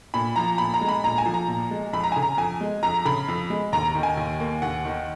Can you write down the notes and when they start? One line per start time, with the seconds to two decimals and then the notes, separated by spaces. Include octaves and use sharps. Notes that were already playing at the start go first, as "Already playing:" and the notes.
0.14 A#2 B5
0.36 F3 A#5
0.58 A#2 B5
0.74 A#5
0.81 G#3
0.88 B5
1.04 A#2 A#5
1.18 G#5
1.26 F3
1.34 A#5
1.48 A#2
1.71 G#3
1.93 F2 B5
2.03 A#5
2.12 C#3 G#5
2.22 A#5
2.38 F2 G#5
2.61 G#3
2.83 F2 A#5
3.05 C#3 B5
3.28 F2
3.50 G#3
3.72 D#2 A#5
3.95 D#3
4.03 G#5
4.17 D#2
4.40 A#3
4.62 D#2 F#5
4.85 D#3